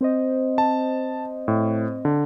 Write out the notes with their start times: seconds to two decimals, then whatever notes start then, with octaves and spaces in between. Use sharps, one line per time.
0.01 C4 C5 D#5
0.58 A5
1.48 A2
2.05 D3